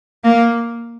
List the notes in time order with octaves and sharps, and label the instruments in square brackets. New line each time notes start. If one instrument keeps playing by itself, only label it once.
[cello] A#3